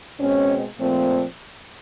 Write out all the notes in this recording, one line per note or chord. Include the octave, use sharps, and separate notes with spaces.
B2 G#3 C4 C#4
A#2 F3 A3 C4